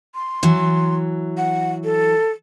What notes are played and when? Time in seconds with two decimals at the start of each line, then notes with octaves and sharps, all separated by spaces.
0.15 C6
0.43 E3 F#3
1.38 F#5
1.84 A4